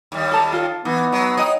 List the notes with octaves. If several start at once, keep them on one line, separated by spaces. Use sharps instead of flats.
D#2 G3
A4 A5 A#5
F4 A4 A5
E3 B3 D#4
F#3
D#4 C#5 D#5 F#5 G5